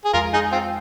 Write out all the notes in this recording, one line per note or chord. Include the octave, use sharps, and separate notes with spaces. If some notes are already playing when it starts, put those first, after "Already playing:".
G#4
F2 F3 G#3 F4 A#4
D#4 G#4
C4 F4